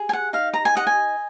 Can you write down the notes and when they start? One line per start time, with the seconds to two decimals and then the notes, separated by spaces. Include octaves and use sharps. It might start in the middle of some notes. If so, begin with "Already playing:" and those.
Already playing: G#4
0.09 G#5
0.13 F#5
0.33 D#4 F5
0.53 A#5
0.65 G#5
0.75 D#5 F#5
0.87 G#5